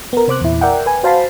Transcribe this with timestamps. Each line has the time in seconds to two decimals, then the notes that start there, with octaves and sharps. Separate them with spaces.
0.13 B3 A#4
0.28 C3 C5 D6 F#6
0.41 E2 A#2 E4
0.61 A#4 D5 E5 F#5 G5
0.86 B4 G#5
1.03 F#4 C5 F5 A5 B5 C6